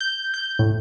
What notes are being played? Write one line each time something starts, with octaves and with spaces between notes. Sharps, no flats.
G6
G6
A2